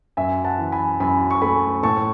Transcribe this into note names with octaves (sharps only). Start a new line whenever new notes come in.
F#2 E5 G#5
F#5 A5
E3
G#5 B5
F#2 G#5 B5
C#6
A3 G#5 B5
A2 A5 C#6